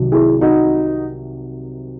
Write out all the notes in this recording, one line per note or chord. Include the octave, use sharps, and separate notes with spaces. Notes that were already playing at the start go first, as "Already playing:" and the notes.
Already playing: C2 C3 D#3 F#3
E4 G#4
D#4 F#4